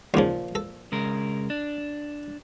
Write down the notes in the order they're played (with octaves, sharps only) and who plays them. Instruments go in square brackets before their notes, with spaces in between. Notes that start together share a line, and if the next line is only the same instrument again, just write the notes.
[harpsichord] D#2 C#3 [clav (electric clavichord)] A#2 F3
[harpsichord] A4
[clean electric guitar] C#3 G#3 A#4
D4